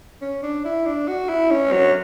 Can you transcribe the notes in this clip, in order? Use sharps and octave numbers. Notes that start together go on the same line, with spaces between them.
C#4
D4
E4
D4
F#4
E4
C#4
F#3